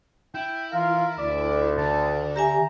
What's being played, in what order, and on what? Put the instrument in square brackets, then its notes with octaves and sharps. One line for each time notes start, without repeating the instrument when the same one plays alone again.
[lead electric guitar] E4 [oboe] G5
[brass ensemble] E3 F4 F5 [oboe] A#4
[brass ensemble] D2 [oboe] D5
[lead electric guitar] D3 [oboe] A5
[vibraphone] G4 E5 G#5 [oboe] A#5